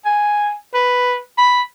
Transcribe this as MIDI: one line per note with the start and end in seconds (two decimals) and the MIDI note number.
0.05 0.53 80
0.74 1.19 71
1.38 1.62 83